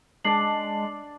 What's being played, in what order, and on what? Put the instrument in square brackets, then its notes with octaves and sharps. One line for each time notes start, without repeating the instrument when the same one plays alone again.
[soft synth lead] G#3 [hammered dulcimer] D4 D5 [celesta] A5 C7 F#7